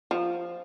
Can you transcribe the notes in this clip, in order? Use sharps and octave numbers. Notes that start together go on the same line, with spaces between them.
F3